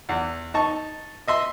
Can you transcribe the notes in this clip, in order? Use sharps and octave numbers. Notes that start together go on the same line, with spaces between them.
E2 F#5
D#4 A5 C#6
D#5 E5 C6